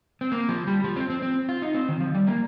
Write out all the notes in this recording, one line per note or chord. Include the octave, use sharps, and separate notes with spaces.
C4
A#3
F3
G3
F3
C4
C4
C4
F4
D#4
C4
D#3
F3
G3
A#3